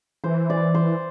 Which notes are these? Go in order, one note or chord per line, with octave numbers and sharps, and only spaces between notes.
E3 C5
D5
C5